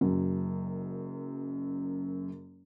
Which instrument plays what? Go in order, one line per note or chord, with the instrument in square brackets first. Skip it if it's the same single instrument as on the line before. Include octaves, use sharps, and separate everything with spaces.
[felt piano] F#1 F#2